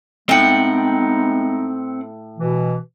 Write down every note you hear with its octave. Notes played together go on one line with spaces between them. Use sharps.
A2 G#3 B3 C4 D#4 F#5 G5
B2 E3